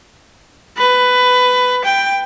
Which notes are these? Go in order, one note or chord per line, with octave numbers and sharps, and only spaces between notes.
B4
G5